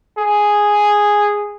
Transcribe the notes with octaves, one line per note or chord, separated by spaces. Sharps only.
G#4